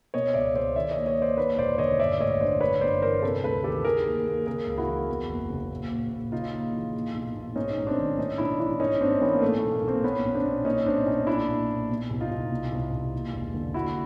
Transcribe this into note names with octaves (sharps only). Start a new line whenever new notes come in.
B2 C#5 D#5
C#2 D5 E5
C#2 C5 D5
D#3 D5 E5
D#2 C#5 D#5
C#5 D#5
D#2
C5 D5
D#2 B4 C#5
E1 C5 D5
D3 C#5 D#5
G2 D5 E5
A1 C#5 D#5
D3 C5 D5
G2 B4 C#5
G1 C5 D5
E3 A#4 C5
C3 A4 B4
D2 A4 B4
D#3 G4 A4
D#3 G#4 A#4
D#2
D#2
C#3 G#4 A#4
C#2
E4 F#4
E3
E2
F#1
C#3
A#2
A#1
A#1
C#3 D#4 F4
D#2
E3
A#2
B1
B1
G#2 C#4 D#4
A1
C4 D4
D#3
A2 C#4 D#4
B1 D4 E4
E3 D4 E4
G#2 C#4 D#4
G#1 C4 D4
E3 B3 C#4
A#3
A#2 A3
A3
B1
A#3
B1
A#3 C4
A#2 B3 C#4
B1
C4 D4
B1
A#2 C#4 D#4
B1 C4 D4
B1 C#4 D#4
A#2 D4 E4
A#1
A#1
B2
C2
D#4 F4
C2
B2
C2
C2
D#2
E1
D3
D#2 E4 F#4